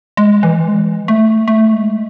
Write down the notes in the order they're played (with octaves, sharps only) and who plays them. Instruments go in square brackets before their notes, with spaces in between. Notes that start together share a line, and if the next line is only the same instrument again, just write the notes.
[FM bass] G#3
E3
G#3
A3
A3
G#3